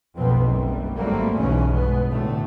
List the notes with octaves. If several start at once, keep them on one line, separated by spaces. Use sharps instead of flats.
F#1 B1 F2 B2 B3 C4
F#1 F#2 G3
G#1 F#3 G3 A3 A#3 C4
B1 E2 G2 C#3 E3 C#4
B2 G#3 B3
D2 A2 D3 A3